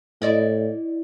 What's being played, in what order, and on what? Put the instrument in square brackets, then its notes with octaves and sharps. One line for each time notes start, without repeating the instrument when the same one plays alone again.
[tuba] A2 [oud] E4 D5 D#5